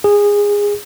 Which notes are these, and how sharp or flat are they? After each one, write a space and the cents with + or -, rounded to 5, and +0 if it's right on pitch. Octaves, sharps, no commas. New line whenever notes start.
G#4 -20